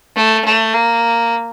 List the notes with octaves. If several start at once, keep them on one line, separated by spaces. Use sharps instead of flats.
A3
A3
A#3